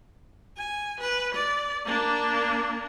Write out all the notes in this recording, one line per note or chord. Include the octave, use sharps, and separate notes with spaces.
G#5
B4
D5
A#3 D4